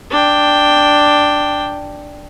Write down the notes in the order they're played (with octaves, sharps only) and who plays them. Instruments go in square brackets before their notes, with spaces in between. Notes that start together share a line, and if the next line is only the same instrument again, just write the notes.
[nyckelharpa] D4 G5